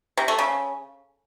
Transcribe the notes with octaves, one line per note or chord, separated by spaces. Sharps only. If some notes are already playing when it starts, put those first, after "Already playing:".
C3
A3
C#3